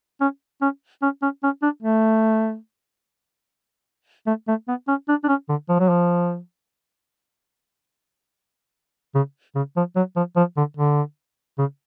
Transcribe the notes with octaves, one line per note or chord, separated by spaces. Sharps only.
C#4
C#4
C#4
C#4
C#4
D4
A3
A3
A3
B3
C#4
D4
D4
C#4
D3
F3
F#3
F3
C#3
C#3
F3
F#3
F3
F3
D3
D3
C#3